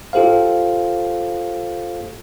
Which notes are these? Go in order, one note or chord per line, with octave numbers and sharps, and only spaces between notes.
F4 G4 A4 C5 F5